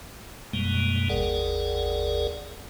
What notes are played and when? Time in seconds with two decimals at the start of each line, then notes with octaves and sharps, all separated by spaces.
0.53 F#2 B2 G3 G#3 A#3
1.09 G1 D#2 G#4 A#4 D5 F#5